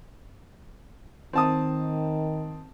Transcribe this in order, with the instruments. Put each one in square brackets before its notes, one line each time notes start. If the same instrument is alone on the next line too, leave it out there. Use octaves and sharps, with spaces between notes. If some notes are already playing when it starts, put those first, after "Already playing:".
[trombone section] D#3 [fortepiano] C4 A5 D#6